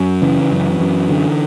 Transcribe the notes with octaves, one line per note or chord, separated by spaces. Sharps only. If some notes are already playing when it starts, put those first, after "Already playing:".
Already playing: F#2
C#3 E3
F#2
F#2
D3